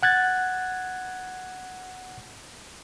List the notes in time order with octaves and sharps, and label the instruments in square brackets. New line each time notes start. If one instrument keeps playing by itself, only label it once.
[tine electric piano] F#5 F#6 G#6 A6